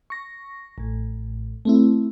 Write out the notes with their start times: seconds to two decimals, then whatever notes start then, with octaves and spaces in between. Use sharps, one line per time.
0.10 C#6 A#6
0.78 A1 A2
1.65 A3 C4 E4